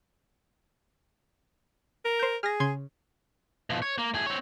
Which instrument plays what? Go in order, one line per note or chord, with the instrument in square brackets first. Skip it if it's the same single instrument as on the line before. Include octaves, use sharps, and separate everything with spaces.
[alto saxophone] A#4
[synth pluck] C5 G6
[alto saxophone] G#4 [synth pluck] F6 A#6
[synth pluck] C#3 C6 G#6
[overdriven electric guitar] B2 F3
C#5
A#3
A2 G#4
C4 C#5